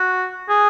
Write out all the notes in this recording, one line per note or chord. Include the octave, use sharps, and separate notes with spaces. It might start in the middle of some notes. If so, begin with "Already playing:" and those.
Already playing: F#4
G#4